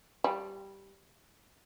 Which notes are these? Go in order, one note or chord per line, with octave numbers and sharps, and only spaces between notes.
G3